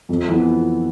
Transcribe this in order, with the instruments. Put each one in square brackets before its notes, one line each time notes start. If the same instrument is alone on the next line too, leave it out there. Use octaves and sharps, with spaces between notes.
[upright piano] F2
E3 B3